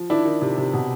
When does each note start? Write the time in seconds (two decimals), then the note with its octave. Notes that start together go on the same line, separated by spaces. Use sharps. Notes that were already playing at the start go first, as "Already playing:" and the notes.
Already playing: F3
0.10 D#3 D4 E4
0.25 D#3
0.42 C3
0.58 C3
0.73 B2